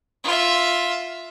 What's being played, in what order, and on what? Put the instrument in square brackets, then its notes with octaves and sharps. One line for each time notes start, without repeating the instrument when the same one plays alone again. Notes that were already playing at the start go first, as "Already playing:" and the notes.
[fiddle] F4 E5